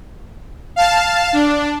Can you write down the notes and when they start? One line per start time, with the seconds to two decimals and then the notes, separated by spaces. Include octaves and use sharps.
0.76 F5 A5
1.33 D4